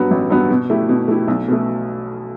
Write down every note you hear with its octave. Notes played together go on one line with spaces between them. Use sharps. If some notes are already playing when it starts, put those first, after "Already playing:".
Already playing: G2 F#3 B3
A1
G2 F#3 B3
B2
A3 E4 G4
B2
A3 E4 G4
B1
B2 A3